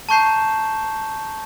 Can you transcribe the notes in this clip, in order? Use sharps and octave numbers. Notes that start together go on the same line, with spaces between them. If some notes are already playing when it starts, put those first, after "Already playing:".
A5 A#5 C#6 G6 C7 E7